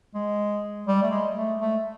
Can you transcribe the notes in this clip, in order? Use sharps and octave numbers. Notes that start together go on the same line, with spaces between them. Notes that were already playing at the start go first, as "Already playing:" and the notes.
G#3
G3
A3
G#3
A3
A3